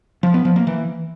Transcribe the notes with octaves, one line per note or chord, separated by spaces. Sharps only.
F3
B3
F3
A#3
E3